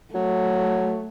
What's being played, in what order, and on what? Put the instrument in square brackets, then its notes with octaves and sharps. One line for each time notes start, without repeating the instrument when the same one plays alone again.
[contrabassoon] F#3 [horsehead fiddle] A3